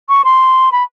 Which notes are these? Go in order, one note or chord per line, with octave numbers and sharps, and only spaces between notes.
C#6
C6
B5